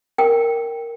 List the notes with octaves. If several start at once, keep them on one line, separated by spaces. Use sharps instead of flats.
A#4 G5